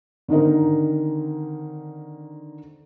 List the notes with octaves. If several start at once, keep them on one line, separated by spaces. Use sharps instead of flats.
D3 D#3 C4 D#4 A#4